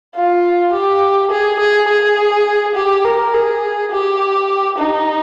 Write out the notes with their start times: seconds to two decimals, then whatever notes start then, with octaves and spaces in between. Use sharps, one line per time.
0.15 F4
0.73 G4
1.31 G#4
1.59 G#4
1.88 G#4
2.75 G4
3.04 A#4
3.34 G#4
3.91 G4
4.78 D#4